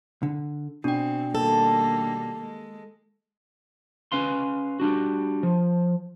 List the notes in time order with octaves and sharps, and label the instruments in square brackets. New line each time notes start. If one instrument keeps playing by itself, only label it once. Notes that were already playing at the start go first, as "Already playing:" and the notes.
[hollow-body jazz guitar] D3
[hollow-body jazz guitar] B2 [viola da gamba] C4 [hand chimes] D4 G5
[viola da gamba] D#3 G3 A#3 [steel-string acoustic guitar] A4
[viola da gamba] G#3
[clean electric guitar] C#4 B4 F5 C6
G3 D4 F#4
F3